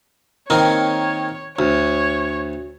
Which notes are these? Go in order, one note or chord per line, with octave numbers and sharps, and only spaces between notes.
D#3 A#3 C4 C#5
D2 C#5